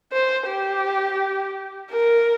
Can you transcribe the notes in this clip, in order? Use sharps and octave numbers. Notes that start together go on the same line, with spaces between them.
C5
G4
A#4